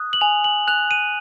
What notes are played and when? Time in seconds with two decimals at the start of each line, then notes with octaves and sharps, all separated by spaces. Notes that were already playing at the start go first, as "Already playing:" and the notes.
Already playing: D#6 F#6
0.13 F#7
0.21 G#5 F7
0.44 F#7
0.68 F#6 F7
0.91 D#7